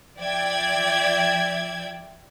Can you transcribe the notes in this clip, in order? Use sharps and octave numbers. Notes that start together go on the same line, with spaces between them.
F3 D5 E5 G5 G#6